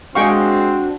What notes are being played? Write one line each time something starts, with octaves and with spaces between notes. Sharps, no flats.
G#3 C4 D4 F#4 G#4 F5 G5 C#6